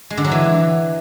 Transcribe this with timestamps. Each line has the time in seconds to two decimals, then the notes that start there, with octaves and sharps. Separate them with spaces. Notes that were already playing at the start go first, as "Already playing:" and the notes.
0.10 G#3
0.17 D3
0.24 F#3
0.31 E3